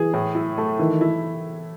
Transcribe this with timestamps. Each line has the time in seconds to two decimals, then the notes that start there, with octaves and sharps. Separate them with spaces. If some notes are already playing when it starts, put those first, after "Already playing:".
Already playing: E3 G#4
0.14 A2
0.35 E4
0.58 A3
0.79 D#3 E3
1.01 E4